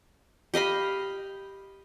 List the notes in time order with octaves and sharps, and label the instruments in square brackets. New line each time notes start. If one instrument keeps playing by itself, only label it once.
[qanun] G4 D#5 F5 B5